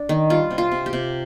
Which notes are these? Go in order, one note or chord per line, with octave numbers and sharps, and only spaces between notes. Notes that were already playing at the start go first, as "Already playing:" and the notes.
Already playing: D4
D#3
G3 F4
C3
F4
C3
G4
C3